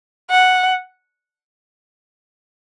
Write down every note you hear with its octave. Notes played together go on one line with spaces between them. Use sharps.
F#5